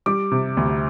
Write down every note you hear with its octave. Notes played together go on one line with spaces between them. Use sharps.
G3 D6
C3
D2